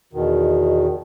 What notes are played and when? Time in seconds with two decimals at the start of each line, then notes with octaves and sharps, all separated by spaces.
0.13 E2 B2 D#3